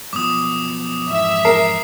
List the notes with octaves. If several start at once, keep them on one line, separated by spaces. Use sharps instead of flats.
F#2 B2 F3 D6 D#6
F2 G#2 E3 E5
A#4 C7